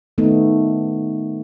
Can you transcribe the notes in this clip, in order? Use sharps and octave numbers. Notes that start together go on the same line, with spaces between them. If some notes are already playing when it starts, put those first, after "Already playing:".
D#3 A3 B3 D#4